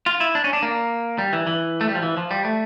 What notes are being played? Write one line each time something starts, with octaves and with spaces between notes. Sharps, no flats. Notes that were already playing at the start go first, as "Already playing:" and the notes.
F4
E4
D4
C#4
D4
A#3
G3
E3
E3
A3
G3
F3
E3
F3
G3
A3